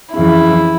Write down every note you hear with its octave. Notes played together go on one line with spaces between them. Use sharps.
F2 C#3 E3 E4